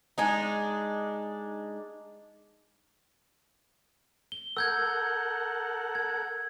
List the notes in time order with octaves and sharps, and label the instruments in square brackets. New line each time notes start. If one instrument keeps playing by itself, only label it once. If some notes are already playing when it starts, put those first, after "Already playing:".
[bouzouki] G#3 D4 D#4
[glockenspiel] G7
[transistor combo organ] A4 A#4 F#5 [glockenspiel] E6 G6 G#6
[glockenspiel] G#6